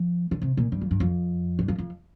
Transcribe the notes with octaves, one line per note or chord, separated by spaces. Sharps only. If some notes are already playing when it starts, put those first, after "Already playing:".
Already playing: F3
D3
C3
A#2
G2
F2
G2
F2
G2
F2
F2